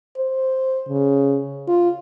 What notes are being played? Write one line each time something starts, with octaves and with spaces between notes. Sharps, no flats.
C5
C#3
F4